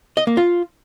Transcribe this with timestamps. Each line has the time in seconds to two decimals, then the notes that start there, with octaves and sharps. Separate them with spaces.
0.17 D#5
0.27 A#3
0.37 F4